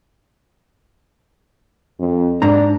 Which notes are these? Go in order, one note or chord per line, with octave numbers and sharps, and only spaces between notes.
F2
G#2 D4 A#5